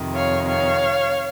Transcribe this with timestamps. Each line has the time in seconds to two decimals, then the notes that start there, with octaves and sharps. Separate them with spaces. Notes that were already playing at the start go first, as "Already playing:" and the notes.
Already playing: F2 C3 D#3
0.14 C#5 F5
0.46 C#5 F5